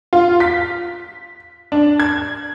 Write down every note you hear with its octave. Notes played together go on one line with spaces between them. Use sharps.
F4
B6
D4
G#6